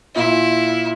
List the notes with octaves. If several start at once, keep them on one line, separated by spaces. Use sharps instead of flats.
A#2 E4